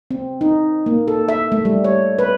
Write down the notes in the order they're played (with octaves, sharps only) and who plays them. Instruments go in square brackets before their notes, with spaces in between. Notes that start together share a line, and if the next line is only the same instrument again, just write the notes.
[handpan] C4
D#4
A#3
A4
E5
A3
G3
C#5
B4